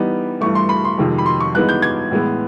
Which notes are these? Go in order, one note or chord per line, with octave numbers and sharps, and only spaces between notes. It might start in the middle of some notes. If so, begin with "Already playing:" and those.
Already playing: E3 G3 B3 D#4
G2 E3 A3 C#6
C6
B5
C6
F2 C3 D#3 G#3
B5
C6
C#6
G2 E3 G#3 B3 D#4 F#6
G6
G#6
A2 E3 G#3 B3